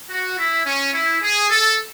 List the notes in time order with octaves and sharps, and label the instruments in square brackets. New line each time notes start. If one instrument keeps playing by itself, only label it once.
[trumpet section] F#4
E4
C#4
E4
G#4
A4